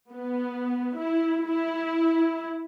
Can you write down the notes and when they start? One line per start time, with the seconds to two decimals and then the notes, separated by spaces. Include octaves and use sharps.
0.13 B3
0.97 E4
1.47 E4